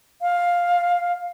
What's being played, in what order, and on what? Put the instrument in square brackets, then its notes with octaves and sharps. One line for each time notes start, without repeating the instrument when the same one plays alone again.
[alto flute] F5